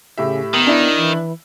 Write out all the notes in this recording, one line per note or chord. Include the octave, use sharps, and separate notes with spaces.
A2 C#3 G4 E5
D#3 B3
D4 E4
E3